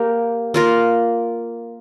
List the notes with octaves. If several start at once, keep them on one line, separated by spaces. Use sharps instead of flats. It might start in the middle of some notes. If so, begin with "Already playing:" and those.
Already playing: A#3 G4 A#4
A#3 F4 A#4